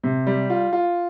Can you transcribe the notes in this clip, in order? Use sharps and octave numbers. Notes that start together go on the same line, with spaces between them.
C3
G3
F4
F4